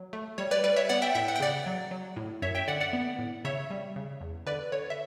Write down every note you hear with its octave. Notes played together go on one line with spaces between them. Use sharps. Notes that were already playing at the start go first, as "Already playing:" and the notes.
Already playing: F#3
A3
G3 C#5
B4 D5
G3 B4 D5
C#5 E5
B3 D5 F#5
E5 G5
A2 E5 G5
F#5
G5
C#3 D5 F#5
F#3
F#3
A2
F#2 C#5 E5
E5 G5
D3 D5 F#5
D5 F#5
B3
A2
C#3 C#5 E5
G3
C#3
E2
D3 B4 D5
D3 C#5
E5